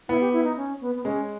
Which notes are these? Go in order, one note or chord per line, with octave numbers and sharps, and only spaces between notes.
B3 E4
G4
E4
D#4
C#4
B3
B3
G#3 C#4